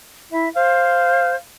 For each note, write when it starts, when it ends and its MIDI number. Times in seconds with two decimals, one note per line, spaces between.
0.32 0.48 64
0.32 0.49 76
0.55 1.36 72
0.55 1.37 77